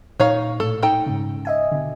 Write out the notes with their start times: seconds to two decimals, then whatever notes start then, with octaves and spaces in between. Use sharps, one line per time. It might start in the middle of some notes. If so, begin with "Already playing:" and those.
0.20 A#2 A#3 D#4 C#5 F5
0.60 A2 A4
0.83 D#4 A4 G5
1.06 G#2 C#3
1.45 D#5 E5 G#5
1.71 B2 D3